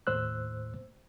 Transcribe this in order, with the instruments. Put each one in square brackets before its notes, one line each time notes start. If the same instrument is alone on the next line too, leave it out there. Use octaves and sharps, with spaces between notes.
[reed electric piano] D#2 A2 C5 E6 F#6